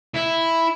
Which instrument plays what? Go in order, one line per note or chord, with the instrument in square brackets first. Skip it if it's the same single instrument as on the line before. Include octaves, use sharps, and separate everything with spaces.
[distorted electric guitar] E4